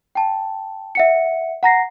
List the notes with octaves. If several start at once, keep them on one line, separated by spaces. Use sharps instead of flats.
G5 A5
E5 F#5 C#7
F#5 A#5 A#6 C7